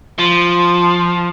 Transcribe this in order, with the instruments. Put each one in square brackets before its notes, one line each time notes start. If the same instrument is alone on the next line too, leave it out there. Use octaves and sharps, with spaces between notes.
[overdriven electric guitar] F3